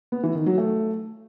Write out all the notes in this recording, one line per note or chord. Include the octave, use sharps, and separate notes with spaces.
B3
E3
D#3
F#3
A3